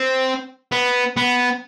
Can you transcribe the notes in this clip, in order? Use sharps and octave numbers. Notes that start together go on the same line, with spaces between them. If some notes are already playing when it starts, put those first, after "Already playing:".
Already playing: C4
B3
B3